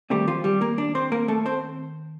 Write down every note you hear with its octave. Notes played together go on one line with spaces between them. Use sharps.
D#3 G3 A3 C4 G4
F3 F4
G3 G4
A#3 A#4
D4 D5
C4 C5
A#3 A#4
A3 A4
C4 C5